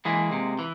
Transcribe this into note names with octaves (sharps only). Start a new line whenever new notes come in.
E3 G#3 A#3
C3
E3